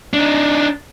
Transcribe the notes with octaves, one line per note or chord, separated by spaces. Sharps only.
D4 D#4